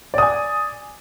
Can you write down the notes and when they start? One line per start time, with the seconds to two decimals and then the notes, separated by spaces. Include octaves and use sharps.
0.14 D5
0.18 D#6
0.23 G#5